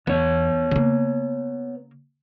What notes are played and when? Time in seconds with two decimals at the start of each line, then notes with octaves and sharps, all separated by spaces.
0.07 E2 B3 C#5
0.71 C#3 A#3